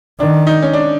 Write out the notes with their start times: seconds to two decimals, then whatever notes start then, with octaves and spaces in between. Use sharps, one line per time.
0.19 D#3 D4
0.47 D#4
0.62 C#4
0.73 D4